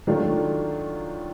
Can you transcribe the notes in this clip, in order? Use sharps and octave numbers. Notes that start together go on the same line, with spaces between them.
D#3 F#3 A3 D4 F4